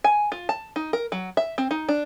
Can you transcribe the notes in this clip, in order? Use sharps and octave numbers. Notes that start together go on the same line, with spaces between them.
G#5
F4
A5
D#4
A#4
F#3
E5
C4
D#4
D4